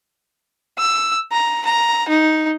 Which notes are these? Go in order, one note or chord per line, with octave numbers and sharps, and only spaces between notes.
E6
A#5
A#5
D#4